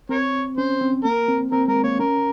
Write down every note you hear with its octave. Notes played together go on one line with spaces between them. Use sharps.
C4 A#4 C#5
C#4 C5
C4
A#3 A#4
C4
C4 A#4
G#3 A#4
A#3 C#5
C#4 A#4